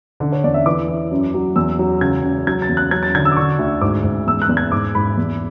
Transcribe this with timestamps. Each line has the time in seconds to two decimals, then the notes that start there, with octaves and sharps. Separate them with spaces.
0.20 D3 D5
0.32 C#5
0.44 E2 D5
0.54 E5
0.66 E3 D6
0.88 E3
1.11 F#2
1.34 F#3
1.56 E2 E6
1.79 F#3
2.01 C#2 G#6
2.24 C#2
2.47 F#3 G#6
2.62 A6
2.69 E2
2.77 F#6
2.91 F#3 G#6
3.03 A6
3.15 D3 G#6
3.25 E6
3.32 D6
3.37 D3 C#6
3.59 D2
3.81 G#2 D6
4.04 G#2
4.27 E2 E6
4.42 F#6
4.49 E2
4.57 G#6
4.72 G#2 D6
4.95 G#2 B5
5.17 E2